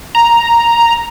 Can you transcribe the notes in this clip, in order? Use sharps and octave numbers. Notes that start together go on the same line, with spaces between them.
A#5